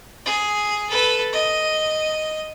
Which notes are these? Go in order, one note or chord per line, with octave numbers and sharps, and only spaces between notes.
G#4
A4 B4
D#5